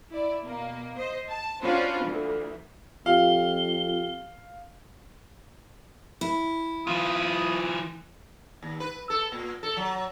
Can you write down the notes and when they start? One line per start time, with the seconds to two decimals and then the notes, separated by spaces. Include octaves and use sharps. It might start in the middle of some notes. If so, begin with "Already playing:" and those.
0.10 E4 D5
0.45 B2 A#3
0.97 C5 D#5
1.28 A5
1.61 C#4 D4 F4 F#4 B4 C5
2.05 D2 E3
3.06 F2 F4 G4 F5 G5 G7
6.21 E4
6.87 E3 F4 D#6
8.63 D#2
8.80 B4
9.10 A4
9.32 A#2
9.63 A4
9.77 F#3